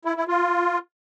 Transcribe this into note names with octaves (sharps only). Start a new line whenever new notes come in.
E4
E4
F4